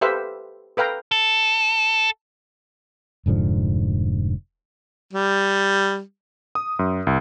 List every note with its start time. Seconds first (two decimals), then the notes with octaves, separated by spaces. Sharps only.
0.01 G4 A4 B4 C5 E5 F5
0.77 A4 B4 F5 G5 A#5
1.12 A4
3.26 F1 G#2 D3 F3
5.13 G3
6.55 D#6
6.79 F#2
7.07 C2